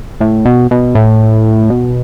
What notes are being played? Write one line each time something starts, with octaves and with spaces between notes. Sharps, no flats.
A2
B2
B2
A2
B2